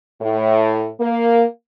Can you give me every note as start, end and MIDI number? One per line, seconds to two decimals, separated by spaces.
0.21 0.86 45
1.00 1.43 58